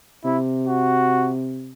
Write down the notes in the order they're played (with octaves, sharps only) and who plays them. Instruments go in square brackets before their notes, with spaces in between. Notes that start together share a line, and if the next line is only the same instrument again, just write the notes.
[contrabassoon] C3 [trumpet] E4
[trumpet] F#4